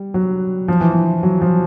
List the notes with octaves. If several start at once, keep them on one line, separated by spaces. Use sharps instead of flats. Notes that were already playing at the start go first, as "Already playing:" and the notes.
Already playing: G3
F#3
F3
E3
F3
F#3
F3